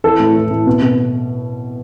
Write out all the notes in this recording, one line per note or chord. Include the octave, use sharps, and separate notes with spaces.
E3 A4
A2
E3
A2
B2
B2